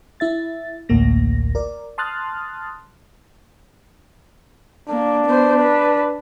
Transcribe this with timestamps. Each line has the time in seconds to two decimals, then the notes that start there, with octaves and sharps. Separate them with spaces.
0.20 E4 E5 A6
0.89 A1 D2 A2 A#3 A#6
1.55 A#4 D5
1.98 A5 C6 D#6 F6 F#6 A6
4.89 A#3 D4
5.25 B3 C5
5.60 B4